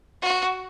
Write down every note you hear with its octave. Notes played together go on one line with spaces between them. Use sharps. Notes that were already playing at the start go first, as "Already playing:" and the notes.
F#4